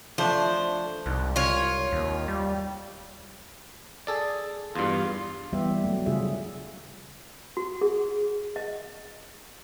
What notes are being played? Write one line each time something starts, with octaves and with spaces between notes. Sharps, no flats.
F3 A3 D4 C5
C2 G#2
F4 C#5
D#2
G3
G#4 A4 D5
E2 G2 F4
E3 G3 B3 G4 E5
F#3 A3
C#3 G3 D4 F4 G#4 E5
F#4
G#4
D#5